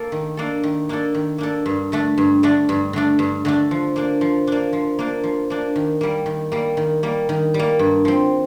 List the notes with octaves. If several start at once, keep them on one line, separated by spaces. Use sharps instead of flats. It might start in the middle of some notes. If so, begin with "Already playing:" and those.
Already playing: A#3 A4
D#3
A#3 D4 A4
D#3
A#3 D4 A4
D#3
A#3 D4 A4
G2
D3 A3 D4
G2
D3 A3 D4
G2
D3 A3 D4
G2
D3 A3 D4
F3
A#3 D4
F3
A#3 D4
F3
A#3 D4
F3
A#3 D4
D#3
G3 A#3
D#3
G3 A#3
D#3
G3 A#3
D#3
G3
A#3
G2
F3 C4